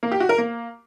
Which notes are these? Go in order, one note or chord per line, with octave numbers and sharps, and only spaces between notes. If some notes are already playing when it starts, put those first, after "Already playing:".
A#3
G4
F#4
A#4
A#3